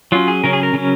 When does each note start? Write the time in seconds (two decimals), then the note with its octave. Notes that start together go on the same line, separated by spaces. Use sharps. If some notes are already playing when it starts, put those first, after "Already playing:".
0.12 F#3 C#4 F4
0.28 G#4
0.44 C#3 F#3 C#4 A#4
0.53 G#4
0.63 A#4
0.73 C#3 F#3 C#4